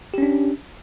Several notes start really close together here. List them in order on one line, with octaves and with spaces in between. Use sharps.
G4 C#4 D4